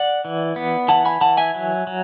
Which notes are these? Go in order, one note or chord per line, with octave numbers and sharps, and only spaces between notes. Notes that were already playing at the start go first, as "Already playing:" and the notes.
Already playing: D5 F#5
E3
B3
E3 F#5 A5
G#5 B5
E3 F#5 A5
E5 G#5
F#3
F#3